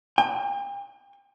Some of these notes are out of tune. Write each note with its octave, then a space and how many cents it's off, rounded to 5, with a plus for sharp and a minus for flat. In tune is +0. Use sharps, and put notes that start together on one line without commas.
G5 +40